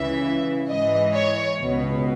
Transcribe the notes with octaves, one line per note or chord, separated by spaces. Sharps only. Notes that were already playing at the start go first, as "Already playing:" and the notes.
Already playing: C#2 C#3 E3 E5
G#2 E3 D#5
C#5
C#2 B2